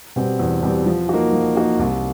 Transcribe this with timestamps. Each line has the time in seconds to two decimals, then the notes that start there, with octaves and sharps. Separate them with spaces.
0.16 B2 G3 C4
0.39 E2
0.63 B2 G3 C4
0.86 F3
1.09 A#3 D#4 F#4
1.33 F3
1.56 A#3 D#4 F#4
1.79 C2